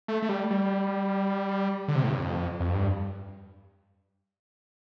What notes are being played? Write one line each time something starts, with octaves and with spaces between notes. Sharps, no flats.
A3
A3
G3
G3
D3
C3
A2
G2
F2
F2
G2